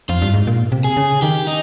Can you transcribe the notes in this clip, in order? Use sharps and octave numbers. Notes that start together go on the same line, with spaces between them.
F2 F4
G2
G#2
A#2
C3
G#4
C#3
D#3 G4
D#4